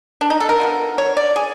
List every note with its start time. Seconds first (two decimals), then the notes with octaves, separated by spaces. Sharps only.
0.21 D4
0.30 D#4
0.40 A4
0.49 A#4
0.58 D3 F3 G#3 B3
0.98 C#5
1.17 D5
1.36 G#4